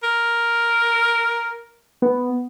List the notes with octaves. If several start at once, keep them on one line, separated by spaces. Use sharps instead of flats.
A#4
B3